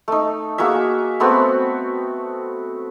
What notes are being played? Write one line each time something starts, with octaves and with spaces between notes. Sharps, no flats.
A3 D#4
A#3 F#4 G#4 E5
A3 B3 C4 F#4